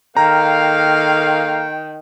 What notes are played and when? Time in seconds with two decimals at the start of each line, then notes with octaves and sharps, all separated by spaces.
0.17 D#3 A#3 A4 F5 G5 A#5